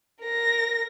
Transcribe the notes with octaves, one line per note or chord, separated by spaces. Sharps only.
A#4 A#6